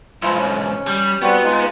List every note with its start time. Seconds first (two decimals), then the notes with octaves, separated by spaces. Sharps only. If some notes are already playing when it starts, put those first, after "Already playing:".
0.22 B1 G#2 E4 F4
0.37 C#4
0.87 G3
1.22 G3 B3 C4 F#4
1.44 G#3 D#4 F4